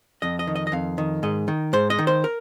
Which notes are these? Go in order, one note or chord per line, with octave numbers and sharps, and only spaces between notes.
F2 D#5
D#5
D#3
D#5
D#5
F2 F5
D#3
G#2 D#5
D#3
G#2 C5
D#5
D#3
C5
A#4